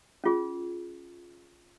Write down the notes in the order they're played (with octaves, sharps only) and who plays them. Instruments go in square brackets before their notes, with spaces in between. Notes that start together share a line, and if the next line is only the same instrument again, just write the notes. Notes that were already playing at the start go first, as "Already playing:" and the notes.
[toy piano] C#4 F4 G#4